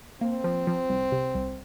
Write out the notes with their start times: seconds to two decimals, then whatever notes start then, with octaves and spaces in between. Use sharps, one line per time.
0.21 A#3 C4
0.44 F3
0.67 F3
0.90 C2
1.12 C3
1.35 C2